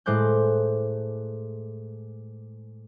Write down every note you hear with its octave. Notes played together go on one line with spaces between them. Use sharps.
A2 G#3 C5 D6 F#6 G6